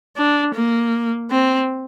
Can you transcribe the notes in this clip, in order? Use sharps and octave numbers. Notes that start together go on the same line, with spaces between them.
D4
A#3
C4